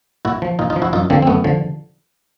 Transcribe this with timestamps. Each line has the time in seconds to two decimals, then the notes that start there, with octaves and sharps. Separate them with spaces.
0.25 A#2 E4 F#4
0.42 F3
0.59 A#2 D#4 F4
0.70 D#4 F4
0.76 F3
0.82 E4 F#4
0.93 F#2 D#4 F4
1.10 D3 F3 A#3 C4
1.22 C4
1.27 F#2 A3 B3
1.44 D3 F3